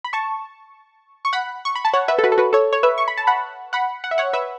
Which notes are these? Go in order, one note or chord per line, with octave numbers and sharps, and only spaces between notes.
B5
A5 C#6
C#6
F#5 B5
C#6
B5
A5
C#5 F#5
B4 E5
A4
F#4 B4
A4
F#4 B4
A4 C#5
C#5
B4 E5
C#6
B5
A5
F#5 B5
F#5 B5
F#5
E5
C#5 F#5
B4 E5